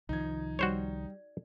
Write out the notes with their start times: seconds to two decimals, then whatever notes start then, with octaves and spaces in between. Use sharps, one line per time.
0.09 C2 D#3 F3 D#4 G#6
0.59 G3 F#4 C5 C#5